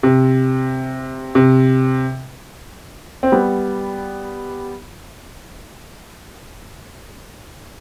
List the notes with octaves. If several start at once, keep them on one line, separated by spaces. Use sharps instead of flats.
C3
C3
C4
G3 B3